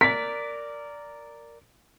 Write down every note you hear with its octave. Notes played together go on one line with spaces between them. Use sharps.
A#4 D5 B6